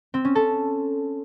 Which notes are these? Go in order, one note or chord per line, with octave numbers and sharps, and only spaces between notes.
C4
C#4
A4